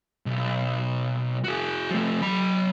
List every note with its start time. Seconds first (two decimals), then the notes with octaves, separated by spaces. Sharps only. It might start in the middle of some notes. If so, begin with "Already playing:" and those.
0.26 B1
1.44 F#4 G#4
1.90 F3 A3
2.21 F#3 B5